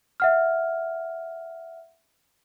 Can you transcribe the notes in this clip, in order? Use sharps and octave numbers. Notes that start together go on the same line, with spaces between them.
E5 F#5 F6